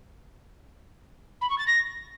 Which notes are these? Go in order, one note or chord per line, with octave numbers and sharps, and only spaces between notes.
B5
C#6
A6
A#6